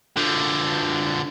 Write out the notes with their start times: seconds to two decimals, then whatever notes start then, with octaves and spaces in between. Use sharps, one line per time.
0.17 D3 F3